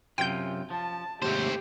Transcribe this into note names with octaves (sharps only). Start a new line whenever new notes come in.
F#2 C3 F4 G5 G6
F3 A5
D#2 G#2 C3 A3 G4 C5